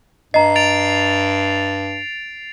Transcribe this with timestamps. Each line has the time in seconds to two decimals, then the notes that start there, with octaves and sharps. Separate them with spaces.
0.34 G2 D#5 A#5 C7
0.56 A6 D7 F7